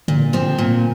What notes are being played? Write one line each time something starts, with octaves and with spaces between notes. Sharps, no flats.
A#2 D3
F3 C4
A#2